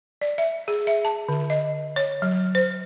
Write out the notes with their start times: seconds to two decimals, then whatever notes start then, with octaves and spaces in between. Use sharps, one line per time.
0.21 D5
0.38 E5
0.68 G#4
0.87 E5
1.05 A5
1.29 D3
1.50 D#5
1.96 C#5
2.22 F#3
2.55 C5